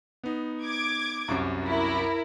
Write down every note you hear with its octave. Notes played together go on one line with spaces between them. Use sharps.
B3 D#4
D6 G#6
C2 F#2
E4 A#4